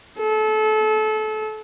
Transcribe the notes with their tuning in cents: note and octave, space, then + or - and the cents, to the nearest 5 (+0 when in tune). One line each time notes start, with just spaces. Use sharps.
A4 -30